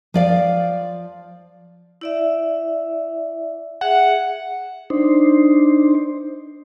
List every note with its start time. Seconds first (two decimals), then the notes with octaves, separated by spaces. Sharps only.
0.14 F3 D5 F5
2.01 E4 D5 E5
3.81 G#4 E5 F#5
4.90 D4 D#4 C5